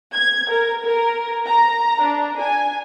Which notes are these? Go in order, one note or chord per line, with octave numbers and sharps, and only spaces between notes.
G#6
A#4
A#4
A#5
D4
G#5